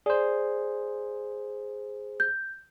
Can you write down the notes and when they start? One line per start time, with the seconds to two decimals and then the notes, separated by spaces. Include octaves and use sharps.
0.06 G#4 C5 D5
2.20 G6